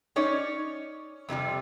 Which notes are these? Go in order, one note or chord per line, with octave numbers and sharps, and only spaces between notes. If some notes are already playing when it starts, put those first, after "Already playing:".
C#4 D#4 C#5 D5
F2 C3 F3 G3